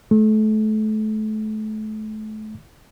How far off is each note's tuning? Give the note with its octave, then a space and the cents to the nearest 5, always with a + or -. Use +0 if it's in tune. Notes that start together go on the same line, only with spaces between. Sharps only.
A3 -30